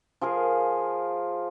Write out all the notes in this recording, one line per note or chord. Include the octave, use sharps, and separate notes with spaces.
F3 G#4 A#4 F5